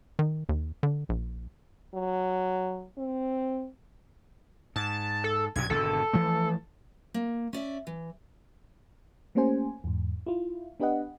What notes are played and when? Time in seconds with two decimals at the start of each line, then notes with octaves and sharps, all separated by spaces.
0.19 D#3
0.49 D#2
0.83 D3
1.09 A#1
1.95 F#3
2.98 C4
4.76 G#2 A5
5.24 A4
5.56 B1 G2 C3 G#6
5.70 G#1 B2 D3 A4
6.13 E3 F3 A3
7.14 A#3
7.53 C#4 D5 E5
7.87 E3
9.35 A3 A#3 C#4 G4 C5 G#5
9.84 E2 G#2
10.26 E4 F4
10.80 B3 D4 G4 B4 D#5 F#5